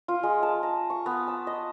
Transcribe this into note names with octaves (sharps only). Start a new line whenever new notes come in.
F4
G#3
A5
A#5
C#6
B3
A5
D#5